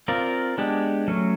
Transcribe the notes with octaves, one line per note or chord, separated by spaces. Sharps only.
C4 F4 A#4 D5 F5
G#3 B3 D4 G4
F#3 A3 C#4